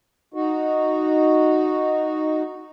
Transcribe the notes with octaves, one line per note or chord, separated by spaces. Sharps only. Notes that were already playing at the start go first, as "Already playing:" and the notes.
D#4 F#4